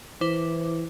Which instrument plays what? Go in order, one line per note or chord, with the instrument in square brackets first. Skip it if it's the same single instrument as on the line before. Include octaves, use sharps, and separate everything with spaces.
[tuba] E3 [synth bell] E4 C5 D6